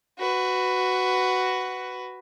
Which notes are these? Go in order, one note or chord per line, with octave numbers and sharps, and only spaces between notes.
F#4 B4